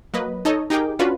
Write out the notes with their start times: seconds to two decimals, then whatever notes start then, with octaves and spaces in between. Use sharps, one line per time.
0.14 F#3 A#3 B4 D#5
0.45 D#4 A4 C#5 D#5
0.70 D#4 G4 G#4 A#4 G5 D6
0.99 C#4 D4 F4 F#4 B4